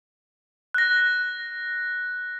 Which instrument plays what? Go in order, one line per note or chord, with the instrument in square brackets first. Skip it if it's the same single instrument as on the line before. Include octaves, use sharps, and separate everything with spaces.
[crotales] F#6 A#6